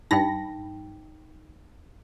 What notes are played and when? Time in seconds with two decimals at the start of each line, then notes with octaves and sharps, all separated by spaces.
0.11 G2 D#4 G5 B5 A#6